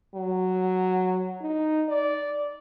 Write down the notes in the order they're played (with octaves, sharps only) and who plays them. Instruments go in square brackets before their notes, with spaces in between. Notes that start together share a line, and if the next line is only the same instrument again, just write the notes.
[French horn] F#3
D#4
D5